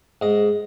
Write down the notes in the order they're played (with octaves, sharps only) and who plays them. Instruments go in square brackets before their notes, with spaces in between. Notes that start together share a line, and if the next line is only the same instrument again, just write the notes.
[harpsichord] G#2 D#5